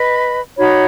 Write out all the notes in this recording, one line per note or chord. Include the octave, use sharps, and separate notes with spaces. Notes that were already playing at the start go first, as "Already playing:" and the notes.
Already playing: B4 D#5 B5
D#4 F#4 C#5 B5